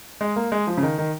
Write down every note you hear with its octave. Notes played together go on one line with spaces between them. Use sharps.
G#3
A#3
G#3
F3
C#3
D#3
D#3